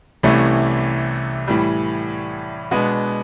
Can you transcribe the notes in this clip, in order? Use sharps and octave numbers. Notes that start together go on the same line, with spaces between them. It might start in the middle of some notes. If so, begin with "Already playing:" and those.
C2 C3 E3 A3 C#4
A2 E3 G3
B2 G#3 B3 D4